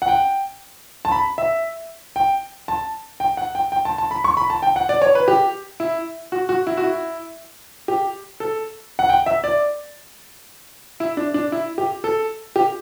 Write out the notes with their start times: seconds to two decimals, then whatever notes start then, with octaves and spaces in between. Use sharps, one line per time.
0.02 F#5
0.08 G5
1.05 A5
1.12 B5
1.38 E5
2.16 G5
2.68 A5
3.20 G5
3.37 F#5
3.55 G5
3.72 G5
3.85 A5
3.98 A5
4.11 B5
4.24 C#6
4.37 B5
4.50 A5
4.62 G5
4.76 F#5
4.89 D5
5.02 C#5
5.15 B4
5.28 G4
5.80 E4
6.32 F#4
6.49 F#4
6.67 E4
6.77 F#4
6.84 E4
7.88 G4
8.40 A4
8.99 F#5
9.09 G5
9.26 E5
9.44 D5
11.00 E4
11.17 D4
11.34 D4
11.52 E4
11.78 G4
12.04 A4
12.56 G4